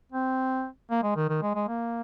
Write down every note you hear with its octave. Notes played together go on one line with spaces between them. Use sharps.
C4
A#3
G#3
D#3
D#3
G#3
G#3
A#3